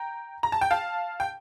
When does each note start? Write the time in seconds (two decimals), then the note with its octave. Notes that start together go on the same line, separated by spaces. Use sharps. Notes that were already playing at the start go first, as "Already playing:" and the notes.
Already playing: G5 A#5
0.43 A#5
0.52 A5
0.61 G5
0.71 F5 A5
1.20 G5